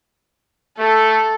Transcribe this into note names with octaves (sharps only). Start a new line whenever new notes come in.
A3 A4